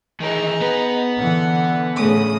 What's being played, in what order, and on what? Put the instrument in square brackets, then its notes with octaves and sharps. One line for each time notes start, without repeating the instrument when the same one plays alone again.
[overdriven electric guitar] D#3 E3 [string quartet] D#4 G#4
[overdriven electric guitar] B3 B4
[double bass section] D3 E3 [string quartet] F#5
[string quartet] A2 C#3 D#6